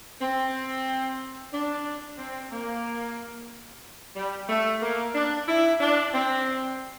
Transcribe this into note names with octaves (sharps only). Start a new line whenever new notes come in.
C4
D4
C4
A#3
G3
A3
A#3
D4
E4
D4
C4